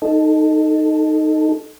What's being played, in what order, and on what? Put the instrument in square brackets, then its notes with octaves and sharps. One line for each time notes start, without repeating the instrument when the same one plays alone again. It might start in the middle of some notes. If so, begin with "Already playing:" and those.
[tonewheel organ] D#4 A4